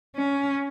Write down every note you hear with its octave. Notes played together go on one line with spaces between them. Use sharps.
C#4